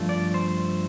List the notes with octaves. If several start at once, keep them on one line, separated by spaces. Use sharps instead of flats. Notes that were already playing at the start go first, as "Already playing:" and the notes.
Already playing: G2 F3 A3
D5
C5